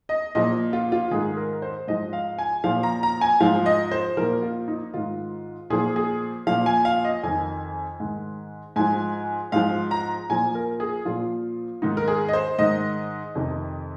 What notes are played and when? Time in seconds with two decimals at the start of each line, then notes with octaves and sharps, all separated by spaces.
0.09 D#5
0.35 A#2 F3 D#5
0.73 F4
0.92 F4
1.11 G#2 D#3 G#4
1.37 A#4
1.62 C5
1.88 G#2 F3 D#5
2.13 F5
2.38 G#5
2.64 A#2 F3 F5
2.83 A#5
3.03 A#5
3.21 G#5
3.40 G#2 F3 F5
3.66 D#5
3.92 C5
4.17 A#2 F3 A#4
4.42 F4
4.68 D#4
4.94 G#2 D#3 F4
5.70 A#2 F3 G#4
5.96 G#4
6.47 A#2 F3 F5
6.66 G#5
6.85 F5
7.05 D#5
7.23 F2 D#3 G#5
8.00 G#2 D#3
8.76 G#2 F3 G#5
9.52 G#2 F3 F5
9.91 A#5
10.30 A#2 F3 G#5
10.55 A#4
10.80 G#4
11.05 A#2 F3 F4
11.82 G#2 D#3 D#4
11.97 A#4
12.08 G#4
12.28 D#5
12.33 C5
12.59 G#2 D#3 D#5
13.35 F2 C3 D#3